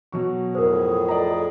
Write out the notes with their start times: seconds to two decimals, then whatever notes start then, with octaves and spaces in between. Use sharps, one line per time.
0.12 B2 F#3 C#6
0.55 F2 A2 G#4 A#4 C5
1.08 D5 D#5 A#5